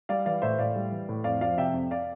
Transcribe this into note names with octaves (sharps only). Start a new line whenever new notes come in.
G3 D5 F5
E3 D5 F5
A2 C5 E5
A2 D5 F5
G3
E3
A2
F2 D5 F5
F3 D5 F5
C3 E5 G5
F2
D5 F5